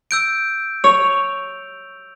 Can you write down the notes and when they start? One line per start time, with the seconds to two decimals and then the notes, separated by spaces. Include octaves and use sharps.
0.11 E6 G6 D7
0.84 C#5 F7